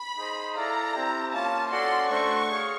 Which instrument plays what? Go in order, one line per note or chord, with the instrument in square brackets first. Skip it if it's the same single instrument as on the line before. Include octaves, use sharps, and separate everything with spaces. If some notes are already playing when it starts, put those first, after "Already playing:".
Already playing: [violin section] B5
[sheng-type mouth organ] D#4 G#4 C5 D#5
[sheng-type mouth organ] E4 A4 D5 F5 [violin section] A#5
[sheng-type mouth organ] C4 E4 G4
[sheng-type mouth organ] A#3 C#4 F4 [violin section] A5
[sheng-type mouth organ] C#4 F#4 A4 D5 F#5 [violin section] C6
[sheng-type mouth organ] A3 D4 F#4 A4 C5 [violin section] C#6
[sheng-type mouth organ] G#4 C#5 F5